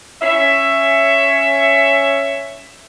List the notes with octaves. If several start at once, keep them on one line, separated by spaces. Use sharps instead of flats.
C#4 E5